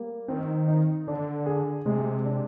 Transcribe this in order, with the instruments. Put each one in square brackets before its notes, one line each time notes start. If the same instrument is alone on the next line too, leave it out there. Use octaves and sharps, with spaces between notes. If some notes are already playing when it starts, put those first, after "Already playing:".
Already playing: [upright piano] G3 A#3
[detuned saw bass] D#3 [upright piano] C4
[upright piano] D#4
[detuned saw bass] D3 [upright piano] D4
[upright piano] G#4
[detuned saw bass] C3 [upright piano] G#3
[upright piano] D4